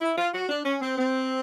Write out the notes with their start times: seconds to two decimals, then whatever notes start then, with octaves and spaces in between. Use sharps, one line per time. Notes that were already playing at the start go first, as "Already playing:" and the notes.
0.01 E4
0.18 F4
0.34 F#4
0.49 D4
0.66 C#4
0.81 C4
0.98 C4